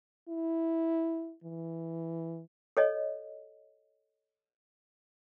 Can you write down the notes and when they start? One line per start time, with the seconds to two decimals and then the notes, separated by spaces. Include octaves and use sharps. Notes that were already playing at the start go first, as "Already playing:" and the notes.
0.29 E4
1.44 E3
2.77 A4 C#5 D#5